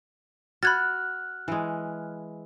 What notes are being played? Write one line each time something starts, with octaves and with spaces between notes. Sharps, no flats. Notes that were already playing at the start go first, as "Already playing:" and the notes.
F#4 B5 F6 F#6 G#6 A6
E3 G#3